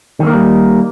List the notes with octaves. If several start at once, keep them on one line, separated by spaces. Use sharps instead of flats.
D#3 G3 A#3 C4 D#4